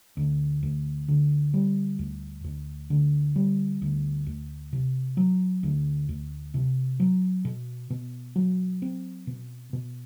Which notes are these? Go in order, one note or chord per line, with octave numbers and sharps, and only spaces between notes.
D2
D2
D3
G3
D2
D2
D3
G3
D2
D2
C3
F#3
D2
D2
C3
F#3
B2
B2
F#3
C4
B2
B2